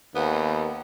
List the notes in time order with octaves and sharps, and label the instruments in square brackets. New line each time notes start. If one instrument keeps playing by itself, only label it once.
[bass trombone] D#2 [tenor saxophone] B3